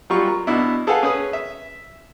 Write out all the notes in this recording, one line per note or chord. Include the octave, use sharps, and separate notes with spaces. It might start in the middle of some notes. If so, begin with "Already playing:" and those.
F#3 G3 F4 C#6
A#4
B2 D4 E4
G#4 A4 B4 F5 F#5 G#5
C#4 G#4 B4 D#6
E5